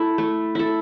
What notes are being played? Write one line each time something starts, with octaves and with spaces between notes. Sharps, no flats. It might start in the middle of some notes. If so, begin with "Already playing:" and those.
Already playing: E4 A4
A3
E4 A4